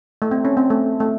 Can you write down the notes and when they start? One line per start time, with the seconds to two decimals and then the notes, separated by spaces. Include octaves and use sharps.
0.22 A3
0.31 C4
0.45 C#4
0.57 C4
0.70 A3
1.00 A3